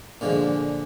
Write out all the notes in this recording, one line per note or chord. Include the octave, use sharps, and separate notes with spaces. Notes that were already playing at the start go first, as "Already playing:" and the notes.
A#2 D3 F3 G#3